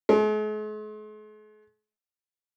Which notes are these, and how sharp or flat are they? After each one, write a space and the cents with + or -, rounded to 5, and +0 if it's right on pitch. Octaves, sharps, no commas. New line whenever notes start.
G#3 +45